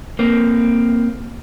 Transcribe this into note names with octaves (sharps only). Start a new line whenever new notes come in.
A#3 C4